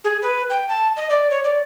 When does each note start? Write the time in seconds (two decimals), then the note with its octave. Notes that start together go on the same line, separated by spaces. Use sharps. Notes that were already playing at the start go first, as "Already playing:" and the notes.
0.04 G#4
0.22 B4
0.50 G5
0.68 A5
0.97 D#5
1.10 D5
1.30 C#5
1.44 D5